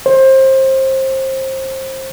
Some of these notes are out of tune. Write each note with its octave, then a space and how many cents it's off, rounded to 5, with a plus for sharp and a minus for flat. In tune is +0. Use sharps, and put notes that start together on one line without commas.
C5 +25